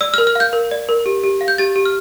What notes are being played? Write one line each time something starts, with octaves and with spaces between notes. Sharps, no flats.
D5 E6
F6
A#4
F6
F5 G6
A#4
D5
A#4
G4
G4
F5
G6
G4 A6
G4
F6